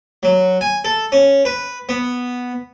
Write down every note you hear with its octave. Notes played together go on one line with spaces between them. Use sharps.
F#3
G#5
A4
C#4
B4
B3